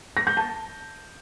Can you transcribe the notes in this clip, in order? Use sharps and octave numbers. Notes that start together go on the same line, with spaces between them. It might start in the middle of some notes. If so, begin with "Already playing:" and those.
A#6
G6
A5